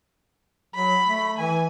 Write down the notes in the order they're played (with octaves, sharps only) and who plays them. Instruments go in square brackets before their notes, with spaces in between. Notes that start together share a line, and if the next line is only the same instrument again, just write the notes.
[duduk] F#3 [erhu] B5
[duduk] A3
[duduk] E3 [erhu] G#5